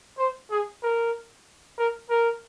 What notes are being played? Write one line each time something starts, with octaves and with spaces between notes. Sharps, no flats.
C5
G#4
A#4
A#4
A#4